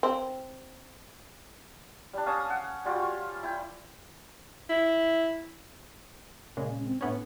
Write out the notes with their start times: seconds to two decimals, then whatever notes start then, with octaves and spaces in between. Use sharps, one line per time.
0.03 C4
2.13 G3 D4
2.26 C#4 F5 A5 D#6
2.50 F#5
2.85 G3 F4 F#4
2.99 F5 C#6
3.43 E4 G5
4.69 E4
6.57 A#2 C#3 G#3 C#4
6.84 C4
7.01 A2 B3 C#4 D4